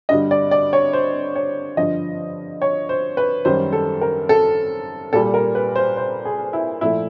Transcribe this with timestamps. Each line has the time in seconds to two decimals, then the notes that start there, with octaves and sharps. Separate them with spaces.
0.09 G2 D3 G3 D#5
0.31 D5
0.51 D5
0.73 C#5
0.93 C5
1.35 C#5
1.77 G2 D3 F3 D#5
2.62 C#5
2.89 C5
3.17 B4
3.45 F#2 D#3 G3 C5
3.73 A4
4.01 A#4
4.29 A4
5.13 A#2 G3 A4
5.34 A#4
5.55 B4
5.76 C5
5.97 C5
6.25 G#4
6.53 E4
6.81 A#2 F3 A3 E4